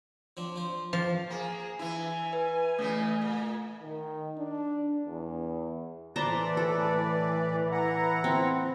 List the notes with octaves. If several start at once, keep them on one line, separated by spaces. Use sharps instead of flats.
F3 C4 D4
F3 C5
F3 D6
A#3 G#4
E3 E4 G#5
B4
C#3 E3 A3
A#2
D#3
D4
E2
A2 E3 B4 C5 D5 A5 A#5
A4
E4 F#5 A#5
C4